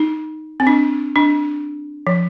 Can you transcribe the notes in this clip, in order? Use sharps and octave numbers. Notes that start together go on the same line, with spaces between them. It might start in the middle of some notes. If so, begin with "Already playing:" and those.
Already playing: D#4
C4
D4
D4
F3